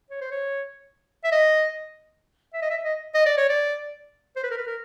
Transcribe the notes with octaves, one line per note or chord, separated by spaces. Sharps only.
C#5
C5
C#5
E5
D#5
E5
D#5
E5
D#5
D#5
D5
C#5
D5
C5
B4
A#4
B4
A#4